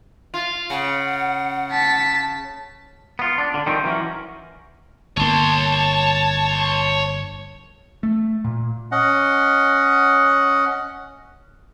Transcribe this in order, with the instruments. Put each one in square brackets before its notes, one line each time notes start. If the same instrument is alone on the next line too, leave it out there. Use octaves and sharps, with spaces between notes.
[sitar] F4
[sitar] C#3 [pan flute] F#5
[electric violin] A5 B6
[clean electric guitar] B3 F4
D4
D3
D#3 F3 G3 C4 C#4
E3 F#3 C#4 A#4
[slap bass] G1 A#3 [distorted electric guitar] C#5 C6 [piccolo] A5
[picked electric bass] A3
A#2
[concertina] C#4 D#5 F#5